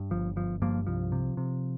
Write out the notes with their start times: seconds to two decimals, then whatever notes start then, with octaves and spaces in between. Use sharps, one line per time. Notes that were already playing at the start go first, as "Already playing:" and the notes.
Already playing: G2
0.11 G1 F3
0.36 G1 F3
0.62 G2 F3 A#3
0.87 C2 F3
1.12 C3
1.37 C3